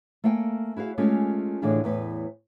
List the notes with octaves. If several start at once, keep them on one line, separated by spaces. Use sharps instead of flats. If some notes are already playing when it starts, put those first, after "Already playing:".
A3 A#3 F5 G5 G#5
E4 F#4 G#4 F5
G#3 A3 C#4 F4 G4 A4
A2 D3 E3 D4 F4 G#4
E2 A2 B4